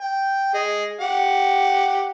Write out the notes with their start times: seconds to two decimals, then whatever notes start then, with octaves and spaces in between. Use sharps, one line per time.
0.01 G5
0.54 G#4 D#5
1.01 G4 F#5